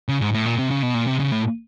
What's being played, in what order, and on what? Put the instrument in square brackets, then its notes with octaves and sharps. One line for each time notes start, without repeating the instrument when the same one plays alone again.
[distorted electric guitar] C#3
G#2
A2
A#2
C3
C#3
B2
A#2
C3
C#3
A2